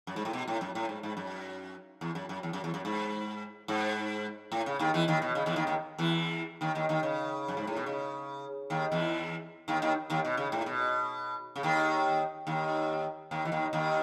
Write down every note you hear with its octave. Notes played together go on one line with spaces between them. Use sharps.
F#2
G#2
A2
B2
A2
F#2
A2
G#2
G#2
F#2
E2
F#2
F#2
E2
F#2
E2
F#2
G#2
G#2
A2
C#3
D#2 D#3
E2 E3
D#2 D#3
B2
C#3
E2 E3
D#2 D#3
D#2 D#3
E2 E3
D#2 D#3
D#2 D#3
D#2 D#3
C#3
F#2
G#2
A2
B2
C#3
D#2 D#3
E2 E3
D#2 D#3
D#2 D#3
D#2 D#3
B2
C#3
A2
B2
C#3
D#2 D#3
D#2 D#3
D#2 D#3
E3
D#2 D#3
D#2 D#3